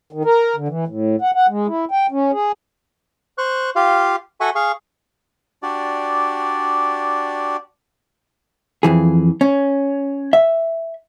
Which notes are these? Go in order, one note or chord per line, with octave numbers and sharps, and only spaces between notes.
D#3
A#4
D3
E3
A2
F#5
F#5
G#3
E4
G5
C#4
G#4
C5 C#6 F#6
F4 G4 F5
F#4 A4 E5 F#5 G#5 C#6
G#4 F5 C#6
D4 F#4 G4 D5
F2 E3 G#4
C#4
E5